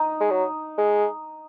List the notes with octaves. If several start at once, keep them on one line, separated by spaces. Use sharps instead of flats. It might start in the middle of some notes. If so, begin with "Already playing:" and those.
Already playing: D#4
G#3
F#3
G#3